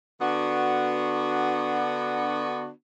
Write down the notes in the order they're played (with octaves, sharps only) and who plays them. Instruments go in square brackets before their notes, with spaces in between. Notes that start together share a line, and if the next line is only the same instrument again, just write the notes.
[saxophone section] D3 B3 D4 F#4